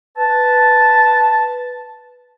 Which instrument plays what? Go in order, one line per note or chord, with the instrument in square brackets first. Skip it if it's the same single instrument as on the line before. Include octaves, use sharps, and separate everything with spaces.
[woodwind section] B4 A5